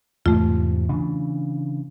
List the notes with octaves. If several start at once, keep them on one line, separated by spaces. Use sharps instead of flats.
E2 G#2 C3 A3 F4
C#3 E3 D4